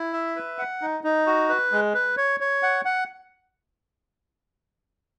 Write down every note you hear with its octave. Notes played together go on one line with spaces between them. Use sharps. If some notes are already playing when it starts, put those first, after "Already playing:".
Already playing: E4
E5
B4
F#5
D#4
D#4
F#4
B4
G#3
B4
C#5
C#5
F#5
F#5